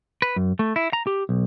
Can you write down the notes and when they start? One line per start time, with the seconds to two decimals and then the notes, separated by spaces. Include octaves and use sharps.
0.22 B4
0.36 F#2
0.59 A3
0.76 E4
0.93 A#5
1.07 G4
1.29 B1